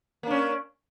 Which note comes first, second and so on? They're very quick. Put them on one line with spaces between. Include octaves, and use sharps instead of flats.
A#3 D4 C#4